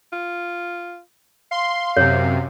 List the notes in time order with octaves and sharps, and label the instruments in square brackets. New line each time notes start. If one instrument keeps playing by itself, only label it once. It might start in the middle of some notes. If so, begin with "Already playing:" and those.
[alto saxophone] F4
[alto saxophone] F5 [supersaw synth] C6
[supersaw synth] F#2 C3 [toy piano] C#5